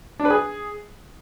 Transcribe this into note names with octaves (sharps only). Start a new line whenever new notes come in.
D4
B4
G#4